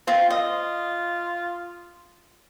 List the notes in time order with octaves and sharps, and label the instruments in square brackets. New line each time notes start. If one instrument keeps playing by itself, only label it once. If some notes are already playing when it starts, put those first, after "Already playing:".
[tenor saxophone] C4 [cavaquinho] F4 F5
[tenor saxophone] F4 [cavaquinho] D#5